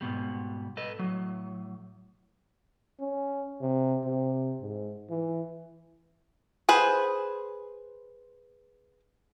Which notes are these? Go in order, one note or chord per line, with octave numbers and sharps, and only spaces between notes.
G#2 B2 G3
A4 B4 D#5
A2 F#3
C#4
C3
C3
G#2
E3
G#4 B4 C5